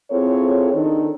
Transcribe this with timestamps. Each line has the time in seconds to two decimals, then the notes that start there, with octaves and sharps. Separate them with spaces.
0.11 C4 E4 F4 G#4 A4 C#5
0.73 D#3 D4 D#4 A4